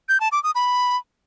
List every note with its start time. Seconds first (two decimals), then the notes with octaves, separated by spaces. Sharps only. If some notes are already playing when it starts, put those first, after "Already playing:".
0.09 G6
0.20 A5
0.32 D6
0.43 D#6
0.55 B5